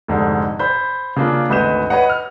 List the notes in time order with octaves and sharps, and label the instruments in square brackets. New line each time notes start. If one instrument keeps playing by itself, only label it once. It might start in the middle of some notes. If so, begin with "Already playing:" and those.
[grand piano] F1 G#2 D3
C5 B5 G6
C#3 A#3 D4 F4
G#1 D2 B4 D#5 G6 E7
B4 C#5 D#5 F#5
F6